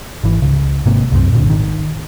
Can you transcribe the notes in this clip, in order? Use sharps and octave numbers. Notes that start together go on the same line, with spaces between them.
G#1 E3
C#2 C#3
G#1 G#2 C3 A#3
C2 F#2 G#3 C4
D1 A#2 D3
G#1 D#3